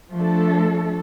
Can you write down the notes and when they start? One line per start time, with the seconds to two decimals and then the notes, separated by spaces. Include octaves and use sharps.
0.12 F3 A3 D4 A4